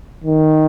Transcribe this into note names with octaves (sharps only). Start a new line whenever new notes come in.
D#3